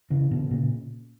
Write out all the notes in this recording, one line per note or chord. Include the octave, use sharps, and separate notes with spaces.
C#3 E3
B2 D3
A#2 C#3